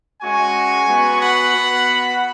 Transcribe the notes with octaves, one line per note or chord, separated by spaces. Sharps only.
G#3 C#4 F#4 G#5 C#6
B3 F#4
F#5 B5
B3 F#4